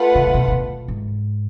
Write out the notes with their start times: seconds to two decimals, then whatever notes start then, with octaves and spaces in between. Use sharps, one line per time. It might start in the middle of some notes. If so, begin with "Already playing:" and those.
Already playing: A3 F4 B4 F#5
0.15 C#3
0.27 C#3
0.34 B2
0.48 A2
0.51 B2
0.88 G#2